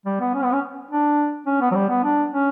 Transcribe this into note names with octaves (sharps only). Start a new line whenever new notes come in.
G3
B3
C#4
B3
C#4
D4
C#4
B3
F#3
G3
B3
D4
C#4